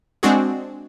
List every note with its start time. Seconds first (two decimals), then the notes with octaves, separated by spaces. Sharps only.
0.23 G#3 C4 D4 F#4 G#4